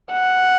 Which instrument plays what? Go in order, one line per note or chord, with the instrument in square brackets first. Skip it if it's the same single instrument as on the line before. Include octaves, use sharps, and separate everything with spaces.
[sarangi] F#5